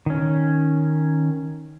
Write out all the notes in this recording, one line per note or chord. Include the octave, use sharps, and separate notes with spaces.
D#3 C#4